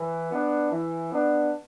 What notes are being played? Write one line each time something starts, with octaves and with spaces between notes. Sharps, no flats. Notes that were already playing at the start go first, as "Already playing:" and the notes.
Already playing: E3
B3 D4
E3
B3 D4